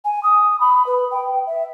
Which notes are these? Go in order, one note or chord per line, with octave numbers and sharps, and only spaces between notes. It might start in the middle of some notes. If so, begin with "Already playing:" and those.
G#5
D#6
B5
B4
G5
E5